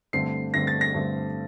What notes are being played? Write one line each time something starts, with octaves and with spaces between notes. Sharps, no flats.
G2 D3 A3 C4 C7
G2 D3 A3 C4 A#6
A6
A#6
G2 D3 A3 C4